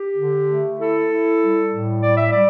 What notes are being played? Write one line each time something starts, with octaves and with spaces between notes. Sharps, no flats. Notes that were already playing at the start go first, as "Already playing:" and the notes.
Already playing: G4
D3
A3
E4 A4
E4
G3
A2
G3 D5
E5
G3 D5